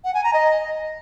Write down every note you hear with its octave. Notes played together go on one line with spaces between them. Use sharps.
F#5
G#5
A#5
D#5